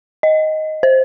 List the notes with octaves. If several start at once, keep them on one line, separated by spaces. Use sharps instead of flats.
D#5
C5